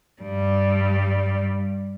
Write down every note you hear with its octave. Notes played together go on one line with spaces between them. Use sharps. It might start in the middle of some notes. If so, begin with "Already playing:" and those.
G2 G3